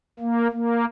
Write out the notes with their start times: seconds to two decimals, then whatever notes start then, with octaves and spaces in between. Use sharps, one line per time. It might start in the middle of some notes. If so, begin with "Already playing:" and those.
0.19 A#3
0.51 A#3